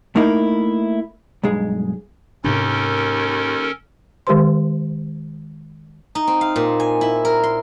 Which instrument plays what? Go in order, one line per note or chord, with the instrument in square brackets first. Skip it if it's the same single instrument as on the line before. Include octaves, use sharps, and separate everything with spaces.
[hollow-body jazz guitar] A3 A#3 D#4 E4 G#4 A#4
B1 G2 G#3 G#4
[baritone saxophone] D#2 [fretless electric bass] G#2 C3 D4 [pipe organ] C#4 A4 A#4
[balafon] D#3 G#3 G4 A#4 C5 C6
[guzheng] D#4
C4
F5
A#2
G#5
E4
A#4
C6